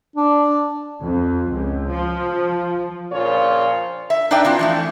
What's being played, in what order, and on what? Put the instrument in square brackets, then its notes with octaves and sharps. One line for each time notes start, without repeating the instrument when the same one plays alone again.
[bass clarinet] D4
[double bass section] F2
C#2
F3
[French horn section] A#2 C#3 F3 D4 F4 C#5
[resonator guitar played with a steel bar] E5
D4 D#4 B4 D5 E5 G5
C4 E4 F4
E3 F3 A3